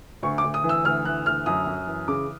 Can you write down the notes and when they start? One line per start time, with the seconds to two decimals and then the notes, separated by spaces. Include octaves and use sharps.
0.23 D2 C#6
0.38 D6
0.44 D2
0.54 D#6
0.64 E3
0.69 E6
0.84 D2 F6
1.05 E3 F#6
1.26 D2 F6
1.46 F#2 D#6
1.67 F#2
1.87 E3
2.08 C#3 D6